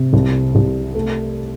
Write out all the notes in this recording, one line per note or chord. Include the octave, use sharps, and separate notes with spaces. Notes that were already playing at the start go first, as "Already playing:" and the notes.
Already playing: C3
C2
C2
A3